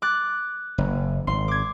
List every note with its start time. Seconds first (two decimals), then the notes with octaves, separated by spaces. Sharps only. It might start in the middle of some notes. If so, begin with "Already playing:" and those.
0.02 D6 F#6 A6
0.78 F#1
1.27 G#1 C6
1.48 D6 G#6